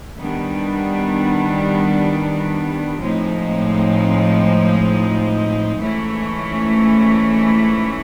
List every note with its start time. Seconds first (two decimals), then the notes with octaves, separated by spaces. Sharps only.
0.19 D#3 G3 B3 D4
2.99 A2 F3 G#3 C4 D#4
5.79 G#2 E3 A3 C#4 E4